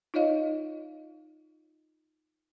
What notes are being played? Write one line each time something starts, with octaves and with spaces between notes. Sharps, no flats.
D#4 F4 C#5 D#5 F5